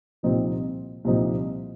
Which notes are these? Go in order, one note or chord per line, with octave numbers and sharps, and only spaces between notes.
C2 A#2 F3 C4 D#4
C2 A#2 F3 C4 D#4